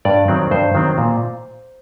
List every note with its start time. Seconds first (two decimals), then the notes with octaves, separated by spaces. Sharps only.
0.05 G2 D5
0.28 D#3 F#3 C4
0.51 G2 C5
0.75 D#3 F#3 C4
0.98 A#2